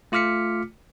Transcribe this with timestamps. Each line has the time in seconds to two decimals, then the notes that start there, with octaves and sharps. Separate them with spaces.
0.12 A3 F4 D6 F6 B6 C#7